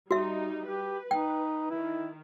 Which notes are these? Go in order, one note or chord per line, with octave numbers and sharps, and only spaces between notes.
G3 D#4 F#4 E5
G4 B4
D#4 G5
D#3 E4